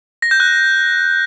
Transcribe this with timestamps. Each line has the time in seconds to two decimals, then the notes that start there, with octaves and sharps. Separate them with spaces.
0.22 A#6
0.31 G6
0.40 F#6